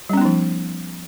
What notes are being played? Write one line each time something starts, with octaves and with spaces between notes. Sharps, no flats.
F3 G3 B3 C#4 D#4